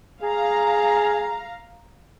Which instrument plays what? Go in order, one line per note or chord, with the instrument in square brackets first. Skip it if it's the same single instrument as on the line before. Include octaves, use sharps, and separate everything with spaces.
[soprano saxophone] G#4 [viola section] F5 A#5